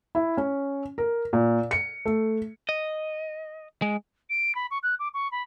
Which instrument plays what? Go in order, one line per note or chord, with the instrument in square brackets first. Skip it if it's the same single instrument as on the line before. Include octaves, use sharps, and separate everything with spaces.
[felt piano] E4
C#4
A#4
A#2
C#7
A3
[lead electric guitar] D#5
G#3
[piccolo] D7
B5
C#6
F#6
D6
C#6
B5